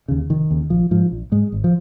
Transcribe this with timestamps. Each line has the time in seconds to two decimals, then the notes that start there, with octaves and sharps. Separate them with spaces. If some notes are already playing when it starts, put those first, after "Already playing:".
0.08 D#2 C#3
0.30 F1 D#3
0.51 D#2 C#3
0.70 A#1 F3
0.91 G#2 F3
1.12 A#1
1.32 G#2 G#3
1.52 G#1
1.64 F3